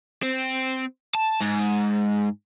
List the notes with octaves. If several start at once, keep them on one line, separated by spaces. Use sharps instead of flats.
C4
A5
G#2